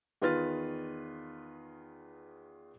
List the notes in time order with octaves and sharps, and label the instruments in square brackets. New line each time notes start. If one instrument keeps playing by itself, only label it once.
[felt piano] E2 D#3 F4 B4 F6 A6